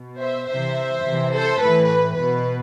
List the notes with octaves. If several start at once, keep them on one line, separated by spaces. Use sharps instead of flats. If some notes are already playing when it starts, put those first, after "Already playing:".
Already playing: B2
C5 E5
C3 E3 C5 E5
C3 E3
A4 C5
A2 E3 B4
B4
B2 B4